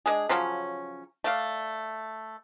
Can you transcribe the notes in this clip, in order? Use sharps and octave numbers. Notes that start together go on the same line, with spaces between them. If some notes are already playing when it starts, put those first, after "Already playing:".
G#3 D4 G#4
C#3 F3 F#3 C#4
A3 D5 F5